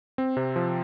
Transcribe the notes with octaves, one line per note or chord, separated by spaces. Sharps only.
C4
C3
F3